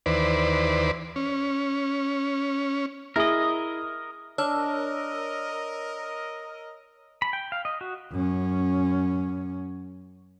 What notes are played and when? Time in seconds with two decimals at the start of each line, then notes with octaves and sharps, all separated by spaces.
0.06 D#2 E3 B4 C5 D5
1.16 C#4
3.16 E4 G#4 A#4 D#5
4.38 D4 A#4 C#5 D#5 E6 F6
7.22 B5
7.33 G5
7.52 F5
7.65 D#5
7.81 F#4
8.12 F#2 C#4